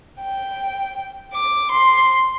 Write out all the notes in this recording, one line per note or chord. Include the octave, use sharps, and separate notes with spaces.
G5
D6
C6